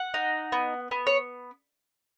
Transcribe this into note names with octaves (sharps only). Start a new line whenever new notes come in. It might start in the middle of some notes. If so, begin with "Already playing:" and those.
Already playing: F#5
D#4
B3
B3
C#5